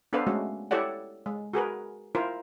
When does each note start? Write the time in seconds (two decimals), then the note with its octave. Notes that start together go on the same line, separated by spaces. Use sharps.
0.13 B3 D4 A4 B4 C5 F5
0.27 G#3 A3 C#4 F#4
0.71 E4 G4 A4 C#5 D5 F#5
1.26 G#3
1.53 F#4 G#4 A#4 B4
2.15 E4 F4 A#4 C5